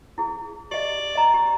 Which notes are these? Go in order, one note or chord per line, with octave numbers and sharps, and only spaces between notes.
E4 G#4
G4 D5 D#5
D#5 A#5
G4